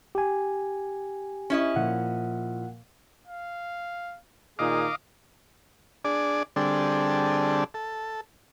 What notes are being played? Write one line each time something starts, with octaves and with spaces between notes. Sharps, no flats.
G4 G#5
C#4 E4 D#5
A#2 F3 F#5
F5
A#2 D#3 D#4 G#4 D#5 F5 D6
D4 G#4 D5
D3 G3 C4 D4 G#4 A4
A4